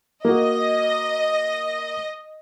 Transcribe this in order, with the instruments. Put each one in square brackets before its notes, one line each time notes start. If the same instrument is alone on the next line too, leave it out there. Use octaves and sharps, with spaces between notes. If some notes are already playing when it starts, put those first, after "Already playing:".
[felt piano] A#3 F#4 [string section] D#5